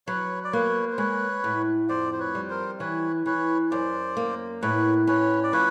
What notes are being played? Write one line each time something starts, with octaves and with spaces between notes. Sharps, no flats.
F#3 B4 C#5
D5
A#3 B4 C#5
C5
G#3 B4 C#5
A2
F2 C5 D5
C5
B4 C#5
G3
A#4 C5
E3 B4 C#5
E3 B4 C#5
F#2 C5 D5
A#3
A2 B4 C#5
C#4 B4 C#5
D5
F3 B4 C#5